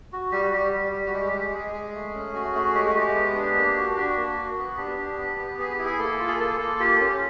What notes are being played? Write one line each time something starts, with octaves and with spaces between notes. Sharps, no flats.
F#4
G3 G4
F#4
G3 G4
G3
G3
F#4
G#3 G4
G4
G#3
G4
G#3 G#4
G#3
A3
C#4
F#4
A3
G#3 G4
F#4
G#3 G4
B3
D4
A#3
F#4
D4 F#4
A#3
F#4
B3
D4 G4
D4
B3
B3
B3 G#4
G4
E4
G#4
A#3 A4
F4
G#4
A#3 A4
A#3
F4 G4
C#4